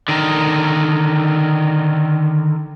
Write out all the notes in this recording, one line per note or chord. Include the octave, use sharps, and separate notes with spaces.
D3 D#3